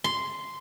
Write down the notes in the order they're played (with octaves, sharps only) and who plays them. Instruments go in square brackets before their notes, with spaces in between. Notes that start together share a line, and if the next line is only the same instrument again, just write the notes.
[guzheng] C6